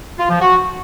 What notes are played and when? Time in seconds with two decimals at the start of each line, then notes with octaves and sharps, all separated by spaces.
0.18 F4
0.29 F3
0.40 F#4